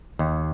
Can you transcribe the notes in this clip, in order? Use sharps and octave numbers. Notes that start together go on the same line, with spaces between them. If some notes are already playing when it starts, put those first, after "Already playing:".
D#2